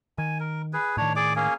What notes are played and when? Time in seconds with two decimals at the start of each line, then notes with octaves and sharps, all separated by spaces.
0.18 D#3 G#5
0.40 A#4
0.73 G#4 B4
0.97 A2 D#3 D4 C#5
1.16 G#4 D5 D6
1.36 A#3 C#4 G#4